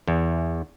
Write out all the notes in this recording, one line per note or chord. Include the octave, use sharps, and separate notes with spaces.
E2